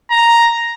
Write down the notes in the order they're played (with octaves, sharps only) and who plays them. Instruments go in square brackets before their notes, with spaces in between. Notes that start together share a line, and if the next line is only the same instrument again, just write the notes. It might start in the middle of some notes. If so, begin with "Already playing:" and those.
[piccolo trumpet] A#5